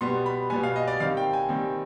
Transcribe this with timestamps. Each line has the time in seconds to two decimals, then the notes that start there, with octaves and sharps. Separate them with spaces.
0.01 B2 G3 B3 C6
0.26 B5
0.50 B2 G3 B3 G#5
0.63 F5
0.76 D#5
0.87 D5
1.00 D#3 G3 C4 F5
1.17 G5
1.33 G#5
1.49 D#3 G3 C4